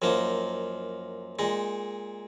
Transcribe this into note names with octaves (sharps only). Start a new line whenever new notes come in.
F#2 F3 A#3 D#4
A#2 G#3 D#4